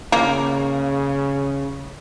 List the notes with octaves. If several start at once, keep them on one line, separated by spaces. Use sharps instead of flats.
C#3 A#3